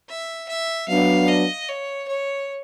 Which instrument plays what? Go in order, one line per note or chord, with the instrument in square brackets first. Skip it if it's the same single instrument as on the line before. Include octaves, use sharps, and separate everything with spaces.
[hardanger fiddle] E5
E5
[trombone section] F#3 B3 D4 [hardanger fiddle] F5
[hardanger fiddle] D#5
C#5
C#5